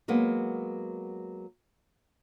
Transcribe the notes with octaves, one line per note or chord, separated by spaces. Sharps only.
F#3 G#3 A#3 B3